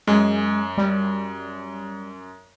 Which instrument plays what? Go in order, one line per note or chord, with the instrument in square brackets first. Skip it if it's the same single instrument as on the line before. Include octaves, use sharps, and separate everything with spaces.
[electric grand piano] F#2 [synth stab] G#3
[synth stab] G3